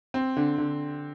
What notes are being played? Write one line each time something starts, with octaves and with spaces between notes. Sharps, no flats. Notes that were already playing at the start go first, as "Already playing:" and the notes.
C4
D3
D3